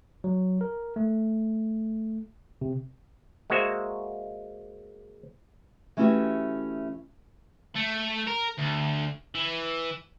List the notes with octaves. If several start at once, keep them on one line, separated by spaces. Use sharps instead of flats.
F#3
A#4
A3
C3
G#3 A#3 F#4 C5 E5
E3 A3 C#4 E4 F#4 G4
A3
A#4
D2
E3